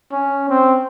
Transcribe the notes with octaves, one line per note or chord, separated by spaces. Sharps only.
C#4
C4